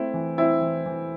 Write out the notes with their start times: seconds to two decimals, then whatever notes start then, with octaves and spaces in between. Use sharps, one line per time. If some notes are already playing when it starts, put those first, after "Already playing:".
Already playing: A3 C4 E4
0.14 E3
0.38 C4 E4
0.61 E3
0.86 E3